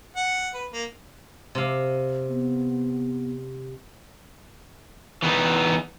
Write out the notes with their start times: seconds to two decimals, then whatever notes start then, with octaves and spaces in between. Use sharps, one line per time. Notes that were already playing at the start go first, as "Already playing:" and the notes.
0.17 F#5
0.54 B4
0.73 A#3
1.55 C3 F5
2.28 B3
5.22 E3 B3 D#4